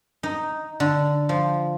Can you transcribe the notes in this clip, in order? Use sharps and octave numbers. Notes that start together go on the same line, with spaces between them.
D#4
D3
F3